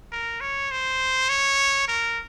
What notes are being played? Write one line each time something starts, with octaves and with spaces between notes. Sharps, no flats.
A#4
C#5
C5
C#5
A#4